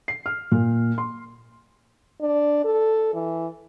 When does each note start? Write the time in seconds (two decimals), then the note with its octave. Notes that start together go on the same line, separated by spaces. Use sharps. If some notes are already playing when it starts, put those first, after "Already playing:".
0.08 C7
0.26 F6
0.52 A#2
0.98 C6
2.21 D4
2.64 A4
3.13 E3